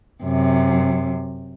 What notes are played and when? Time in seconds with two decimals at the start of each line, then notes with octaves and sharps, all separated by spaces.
0.23 F#2 C3